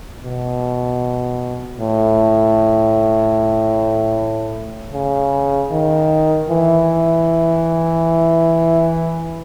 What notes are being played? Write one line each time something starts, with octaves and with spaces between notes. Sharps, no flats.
B2
A2
C#3
D#3
E3